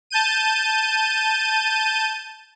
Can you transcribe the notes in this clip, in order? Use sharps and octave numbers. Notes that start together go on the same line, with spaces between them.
A5 G6 D#7